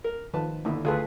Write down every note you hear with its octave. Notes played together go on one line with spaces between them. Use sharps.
A#4
D#3 F3 B4 A5
D#2 D3 E4
D2 F4 G#4 A4 B4